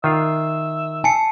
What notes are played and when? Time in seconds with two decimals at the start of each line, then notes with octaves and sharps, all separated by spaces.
0.04 D#3 F4 E5 F5
1.04 G#5 A5 C7 C#7